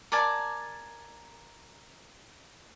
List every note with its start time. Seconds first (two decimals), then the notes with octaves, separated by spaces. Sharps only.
0.12 A#4 D5 G#5 A5